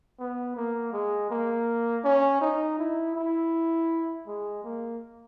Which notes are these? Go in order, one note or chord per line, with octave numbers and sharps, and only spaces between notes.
B3
A#3
G#3
A#3
C#4
D#4
E4
E4
G#3
A#3